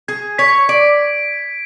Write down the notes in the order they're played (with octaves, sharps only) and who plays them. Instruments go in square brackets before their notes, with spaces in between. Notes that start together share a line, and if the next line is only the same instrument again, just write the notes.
[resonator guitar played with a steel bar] G#4 [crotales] G#6
[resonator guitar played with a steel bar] C#5 [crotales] B6
[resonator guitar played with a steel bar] D5 [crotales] D7